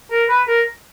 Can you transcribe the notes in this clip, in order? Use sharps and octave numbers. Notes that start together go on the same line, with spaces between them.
A#4
B4
A#4